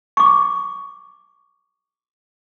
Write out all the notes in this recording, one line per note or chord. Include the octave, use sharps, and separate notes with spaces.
C#6 D6